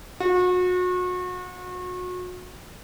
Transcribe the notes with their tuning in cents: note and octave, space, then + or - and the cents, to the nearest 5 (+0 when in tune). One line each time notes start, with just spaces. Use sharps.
F#4 -35